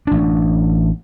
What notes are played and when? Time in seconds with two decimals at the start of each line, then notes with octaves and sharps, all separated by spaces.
0.07 A1 D4